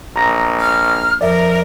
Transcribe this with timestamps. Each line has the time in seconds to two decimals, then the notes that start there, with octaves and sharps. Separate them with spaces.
0.16 A#1 A#5 A#6
0.60 F6
1.21 F2 A#4 D5 E5